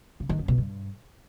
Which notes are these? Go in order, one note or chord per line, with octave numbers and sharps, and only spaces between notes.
C#3
D#3
F#2
B2
G2